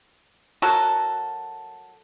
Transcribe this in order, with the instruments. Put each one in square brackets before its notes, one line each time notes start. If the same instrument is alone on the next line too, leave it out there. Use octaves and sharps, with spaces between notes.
[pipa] F#3 F#4 A4 A#4